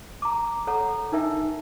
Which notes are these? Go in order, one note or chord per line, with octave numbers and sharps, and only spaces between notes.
A#5 D6
A4 C#5 F#5 A#5
D4 D#4 A#4 E5 G5